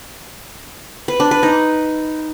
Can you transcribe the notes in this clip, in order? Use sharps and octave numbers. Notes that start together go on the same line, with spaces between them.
B4
D4
B4
D#4